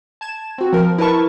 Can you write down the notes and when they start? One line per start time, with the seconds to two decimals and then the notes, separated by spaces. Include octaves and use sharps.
0.21 A5 G#6 E7
0.58 C4 F#4
0.73 F3 A#4
0.98 E4 A#4 B4 A5 C#6